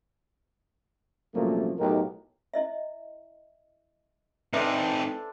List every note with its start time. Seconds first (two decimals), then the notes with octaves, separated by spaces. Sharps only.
1.35 C2 F#2 A#2 F3 A3 A#3
1.79 B1 A2 D#4 G4 A#4
2.54 E4 D#5 E5
4.53 C4 D4 D#4 A4 B4 C5 E5